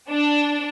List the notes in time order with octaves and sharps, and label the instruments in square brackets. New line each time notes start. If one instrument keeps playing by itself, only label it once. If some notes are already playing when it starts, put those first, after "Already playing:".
[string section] D4